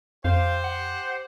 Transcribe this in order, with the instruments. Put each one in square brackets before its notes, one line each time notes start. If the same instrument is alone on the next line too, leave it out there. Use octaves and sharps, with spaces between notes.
[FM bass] F2 [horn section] G4 C5 [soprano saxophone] F5
[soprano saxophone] F#5